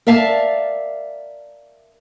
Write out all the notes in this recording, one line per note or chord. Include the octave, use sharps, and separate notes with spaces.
A#4 D5 E5 F5 A5